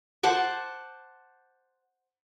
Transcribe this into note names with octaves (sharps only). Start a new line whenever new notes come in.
C5 F#5 A5 D6